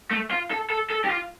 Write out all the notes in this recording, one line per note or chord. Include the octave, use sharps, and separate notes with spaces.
A3
F4
A4
A4
A4
G4
F4